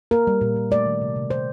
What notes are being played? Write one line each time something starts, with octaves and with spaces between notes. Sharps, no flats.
A#3 A#4
G3
A#2
A#2
A3 D5
D#3
C3
C3
D#3 C5